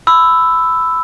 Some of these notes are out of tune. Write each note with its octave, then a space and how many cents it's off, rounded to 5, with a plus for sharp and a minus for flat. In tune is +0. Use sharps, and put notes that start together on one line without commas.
B5 +20 E6 +0